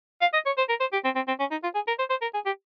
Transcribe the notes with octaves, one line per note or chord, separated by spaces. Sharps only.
F5
D#5
C#5
C5
A#4
C5
G4
C4
C4
C4
C#4
D#4
F4
G#4
A#4
C5
C5
A#4
G#4
G4